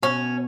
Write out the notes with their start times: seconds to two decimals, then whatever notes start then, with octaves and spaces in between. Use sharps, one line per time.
0.02 B2 C#4